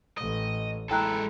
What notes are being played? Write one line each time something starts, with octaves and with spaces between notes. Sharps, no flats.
A1 A2 D#5
G#3 E4 A4 G5 A#5 F#6